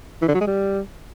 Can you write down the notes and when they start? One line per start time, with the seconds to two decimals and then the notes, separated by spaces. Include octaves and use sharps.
0.22 E3
0.28 D3
0.34 F#3
0.41 G#3
0.47 G3